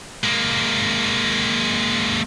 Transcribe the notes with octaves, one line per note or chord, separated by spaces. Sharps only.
G#3 A#3